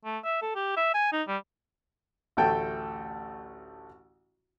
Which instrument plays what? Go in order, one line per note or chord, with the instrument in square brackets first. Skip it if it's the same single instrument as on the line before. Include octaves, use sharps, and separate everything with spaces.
[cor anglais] A3
E5
A4
G4
E5
G#5
D#4
G3
[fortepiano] A1 D2 A3 A4 G5